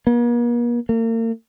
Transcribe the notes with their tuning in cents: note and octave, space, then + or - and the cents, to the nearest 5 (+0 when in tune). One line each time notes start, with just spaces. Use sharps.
A#3 +45
A#3 -40